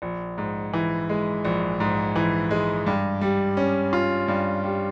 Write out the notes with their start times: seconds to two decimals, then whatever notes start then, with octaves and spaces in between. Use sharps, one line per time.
0.02 A#1
0.38 G#2
0.73 E3
1.09 G#3
1.45 A#1
1.80 G#2
2.16 E3
2.51 G#3
2.86 G2
3.21 G3
3.57 C#4
3.93 F4
4.28 G2
4.64 G3